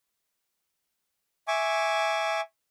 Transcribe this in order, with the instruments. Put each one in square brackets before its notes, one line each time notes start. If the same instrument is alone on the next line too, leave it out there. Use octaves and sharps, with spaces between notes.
[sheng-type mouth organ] E5 G#5 C#6 D6